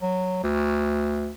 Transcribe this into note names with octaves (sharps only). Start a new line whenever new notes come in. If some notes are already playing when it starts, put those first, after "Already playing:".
F#3
D2